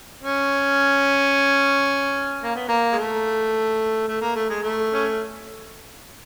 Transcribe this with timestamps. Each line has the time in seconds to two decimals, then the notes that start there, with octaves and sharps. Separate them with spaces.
0.23 C#4
2.43 A#3
2.56 B3
2.69 A#3
2.93 G#3
2.98 A3
4.08 A3
4.21 A#3
4.36 A3
4.49 G#3
4.63 A3
4.93 C#4